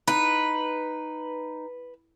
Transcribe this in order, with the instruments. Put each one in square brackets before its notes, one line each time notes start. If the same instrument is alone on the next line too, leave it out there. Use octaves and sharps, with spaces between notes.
[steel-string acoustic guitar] D#4 [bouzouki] B4